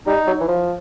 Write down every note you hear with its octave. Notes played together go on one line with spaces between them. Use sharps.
G3 D#4
F#3
E3
F3